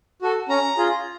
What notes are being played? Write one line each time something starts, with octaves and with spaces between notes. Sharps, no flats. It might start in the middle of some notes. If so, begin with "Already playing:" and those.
F#4 A4
C#4 A#5
F4 G#4